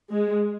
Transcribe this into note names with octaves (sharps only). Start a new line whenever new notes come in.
G#3